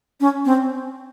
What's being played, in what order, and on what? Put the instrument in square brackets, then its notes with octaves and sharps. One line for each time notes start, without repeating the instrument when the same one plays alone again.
[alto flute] C#4
C4